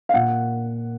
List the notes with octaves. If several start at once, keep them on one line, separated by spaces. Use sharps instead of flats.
F5
A#2 F#5